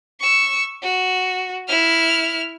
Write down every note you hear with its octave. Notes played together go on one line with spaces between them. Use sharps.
C#6 E6
F#4
E4 F6